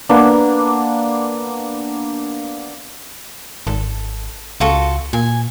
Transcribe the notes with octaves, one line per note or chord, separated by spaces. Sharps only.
A#3 B3 D4
G#1 A4
C#2 F4 F#4 A4
A#2 G#5